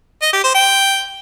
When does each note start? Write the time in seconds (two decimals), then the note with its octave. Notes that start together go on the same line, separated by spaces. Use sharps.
0.22 D#5
0.33 G4
0.44 C5
0.55 G5